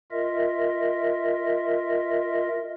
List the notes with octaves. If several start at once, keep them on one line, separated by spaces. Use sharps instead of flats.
F4 A#4 D#5 E5